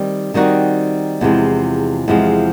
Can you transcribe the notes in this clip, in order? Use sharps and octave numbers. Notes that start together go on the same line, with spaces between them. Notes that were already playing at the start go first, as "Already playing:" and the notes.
Already playing: D#3 G3 C4
D#3 G3 C4 D#4 F#4
E2 C3 F3 G#3
E2 C3 F3 G#3